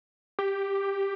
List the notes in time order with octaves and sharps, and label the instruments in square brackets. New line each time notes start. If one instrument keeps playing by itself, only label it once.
[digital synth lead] G4